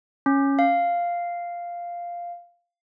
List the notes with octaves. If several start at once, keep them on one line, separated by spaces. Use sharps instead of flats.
C#4
F5